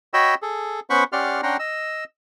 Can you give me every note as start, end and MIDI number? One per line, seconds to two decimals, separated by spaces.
0.14 0.35 66
0.14 0.35 73
0.14 0.35 75
0.14 0.35 79
0.14 0.35 83
0.14 0.35 88
0.42 0.80 68
0.42 0.80 69
0.90 1.04 59
0.90 1.04 61
0.90 1.04 72
0.90 1.04 78
0.90 1.04 83
0.90 1.04 85
1.13 1.41 61
1.13 1.41 67
1.13 1.41 74
1.13 1.41 78
1.13 1.41 84
1.13 1.41 89
1.43 1.57 61
1.43 1.57 62
1.43 1.57 78
1.43 1.57 79
1.43 1.57 82
1.43 1.57 84
1.59 2.04 75
1.59 2.04 88